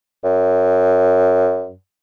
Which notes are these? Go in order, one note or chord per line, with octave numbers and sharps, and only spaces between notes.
F#2